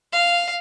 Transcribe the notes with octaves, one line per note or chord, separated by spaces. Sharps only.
F5